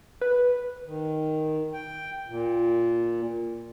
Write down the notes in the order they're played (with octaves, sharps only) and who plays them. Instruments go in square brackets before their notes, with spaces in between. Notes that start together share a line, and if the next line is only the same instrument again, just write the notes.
[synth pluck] B4
[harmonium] D#3
G5
A#2